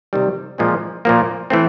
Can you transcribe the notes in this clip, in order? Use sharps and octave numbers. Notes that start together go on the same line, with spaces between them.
C3 D#3 G3
A#2 F3 G#3 C4
A#2 F3 A#3
E3 A3 C4